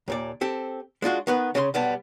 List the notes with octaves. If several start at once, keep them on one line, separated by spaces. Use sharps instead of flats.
D#2 A#2 D5
C4 G4 A4
G#3 D4 F4 F#4
D#3 B3 B4
C#3 C#4 A4 C6
B1 G3 B3 A5